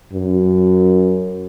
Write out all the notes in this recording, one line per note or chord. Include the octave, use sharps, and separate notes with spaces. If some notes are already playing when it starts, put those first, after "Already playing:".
F#2